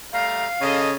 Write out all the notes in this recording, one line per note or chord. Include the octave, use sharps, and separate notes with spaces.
G3 A3 F5 A#5
C#3 A4 D#5